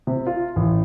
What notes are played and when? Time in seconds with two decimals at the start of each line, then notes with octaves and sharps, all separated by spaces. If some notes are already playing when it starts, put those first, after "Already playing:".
0.07 C3
0.27 F4
0.56 A1